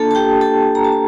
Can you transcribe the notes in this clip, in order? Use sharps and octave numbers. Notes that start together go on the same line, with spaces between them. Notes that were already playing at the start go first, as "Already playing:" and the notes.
Already playing: A#3 D4 F4 A4 A5
A5
G4 G5
A4 A5
A#5
A5
A#5